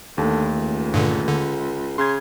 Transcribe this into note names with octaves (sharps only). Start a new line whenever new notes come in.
D#2 D3 A3
C#2
G2 A#2 D3
D3
C#3 C6 G#6